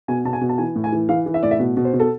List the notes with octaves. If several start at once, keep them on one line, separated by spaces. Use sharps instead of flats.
B2 G#5
B2 A5
G#5
B2
A5
E3 G#5
A2
G#5
E3
E3 F5
E3
E5
A2 D5
E5
B2
B2
C5
B2
A4